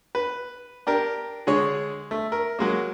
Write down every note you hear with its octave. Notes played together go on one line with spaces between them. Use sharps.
B4
D4 G4 A#4
D3 G#3 G#4 C#5
A3
A#4
F#3 G#3 A#3